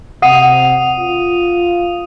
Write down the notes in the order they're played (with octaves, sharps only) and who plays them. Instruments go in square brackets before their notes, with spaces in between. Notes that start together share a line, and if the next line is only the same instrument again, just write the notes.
[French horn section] C3 [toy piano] F#5 [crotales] D#6 D#7
[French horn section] F4